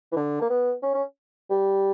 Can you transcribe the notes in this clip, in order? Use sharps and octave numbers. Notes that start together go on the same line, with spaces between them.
E3
D3
A#3
B3
C#4
C#4
G3